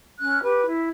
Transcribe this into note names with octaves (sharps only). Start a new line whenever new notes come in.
C#4 F#6
G4 B4
E4